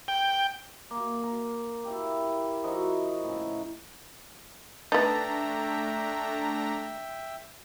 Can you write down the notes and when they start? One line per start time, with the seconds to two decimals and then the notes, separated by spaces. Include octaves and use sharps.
0.08 G5
0.91 A#3
1.23 A#4
1.84 E4 G4
2.64 F3 D#4 E4 F#4
3.24 A2 C#3
4.92 A3 B3 D4 D#4 E5 G5 A5 A#5